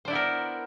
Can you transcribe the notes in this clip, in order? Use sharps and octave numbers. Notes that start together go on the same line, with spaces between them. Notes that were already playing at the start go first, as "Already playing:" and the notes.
B3 D4 E4 A#4 C5